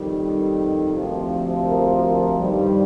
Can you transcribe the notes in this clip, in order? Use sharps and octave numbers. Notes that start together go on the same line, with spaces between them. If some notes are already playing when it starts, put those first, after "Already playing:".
Already playing: F2 D#3 G3
D2 C3 F3
A#4
G2 D#3 G3